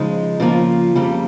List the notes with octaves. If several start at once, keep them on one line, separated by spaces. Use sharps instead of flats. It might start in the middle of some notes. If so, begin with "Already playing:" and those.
Already playing: C#3 F3 G#3 D#4
C#3 F3 A#3 F4
F2 C#3 G3 A#3